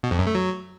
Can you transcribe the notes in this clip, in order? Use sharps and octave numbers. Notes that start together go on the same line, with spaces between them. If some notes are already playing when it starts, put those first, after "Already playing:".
B2
F2
F#2
A3
F#3